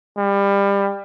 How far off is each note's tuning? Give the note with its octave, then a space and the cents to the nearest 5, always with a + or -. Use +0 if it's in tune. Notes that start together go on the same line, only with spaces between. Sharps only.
G3 +25